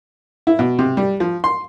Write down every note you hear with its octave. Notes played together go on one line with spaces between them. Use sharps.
E4
B2
C3
G3
F3
C6